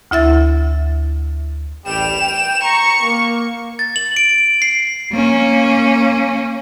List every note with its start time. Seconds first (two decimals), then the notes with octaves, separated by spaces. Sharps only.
0.11 D2 E4 E5 A6
1.86 A1 G3 G5 E7 F7
2.21 G5
2.63 A#5 C#6
3.02 A#3
3.79 A6
3.96 F#7
4.17 D7
4.62 C7
5.12 A#3 C#4